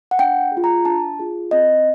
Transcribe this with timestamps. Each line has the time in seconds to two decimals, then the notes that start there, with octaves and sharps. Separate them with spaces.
0.11 F#5
0.19 D4 G5
0.52 G#4
0.57 F4
0.64 A#5
0.85 D4 A5
1.19 F4 G#4
1.51 C4 D#5